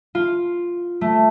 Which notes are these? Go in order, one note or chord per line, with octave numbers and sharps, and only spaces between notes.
F4
A3